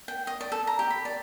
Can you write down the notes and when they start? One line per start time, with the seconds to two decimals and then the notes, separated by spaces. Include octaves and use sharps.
0.08 G5
0.27 D#5
0.41 D5
0.52 A4
0.67 A#5
0.79 G4
0.90 B5
1.05 D5